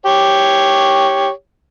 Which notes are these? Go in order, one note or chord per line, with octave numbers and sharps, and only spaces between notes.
G4 C#5